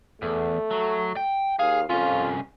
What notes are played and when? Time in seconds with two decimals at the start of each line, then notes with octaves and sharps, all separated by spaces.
0.22 E2 A3
0.71 F#3
1.17 G5
1.59 D#2 G#4 F5
1.89 C2 F2 C#4 F4